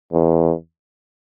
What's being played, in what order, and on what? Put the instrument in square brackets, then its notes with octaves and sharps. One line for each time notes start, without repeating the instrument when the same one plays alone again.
[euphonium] E2